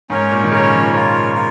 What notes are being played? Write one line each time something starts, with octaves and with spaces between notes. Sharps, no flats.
G#2 C#4 A#4 C#5
A#2
D#3
C#3 C#4 A#4 C#5
F3
F4 A#4 C#5
F4 A#4